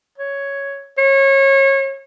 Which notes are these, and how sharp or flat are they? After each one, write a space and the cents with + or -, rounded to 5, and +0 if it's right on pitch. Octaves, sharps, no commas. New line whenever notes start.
C#5 +5
C#5 -30